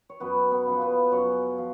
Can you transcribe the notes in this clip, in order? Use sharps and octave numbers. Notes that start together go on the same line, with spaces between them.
C#5
F#2 B3 B4
B3 B4
C#3 F3
B3 B4
F#2 C#4 C#5
F3